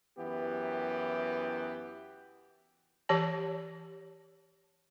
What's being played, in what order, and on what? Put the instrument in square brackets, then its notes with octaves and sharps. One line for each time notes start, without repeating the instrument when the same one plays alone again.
[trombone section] F#2 E3 B3 G4
[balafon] E3 G4 C#5 A5